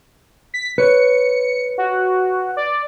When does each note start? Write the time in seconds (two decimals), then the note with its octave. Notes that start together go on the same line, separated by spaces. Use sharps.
0.54 B6
0.78 B4 C#5 C#7
1.78 F#4
2.57 D5